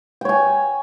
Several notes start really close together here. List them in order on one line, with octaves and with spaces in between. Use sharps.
G5 C#5 G#5